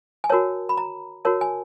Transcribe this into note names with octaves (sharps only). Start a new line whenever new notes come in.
G#5
F#4 A#4 C#5 A5
B5
A#5
F#4 A#4 C#5 A5
G#5